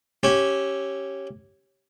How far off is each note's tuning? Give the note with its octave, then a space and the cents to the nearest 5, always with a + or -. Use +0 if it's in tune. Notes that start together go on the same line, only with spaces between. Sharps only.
C#4 -10 G4 -10 E5 +0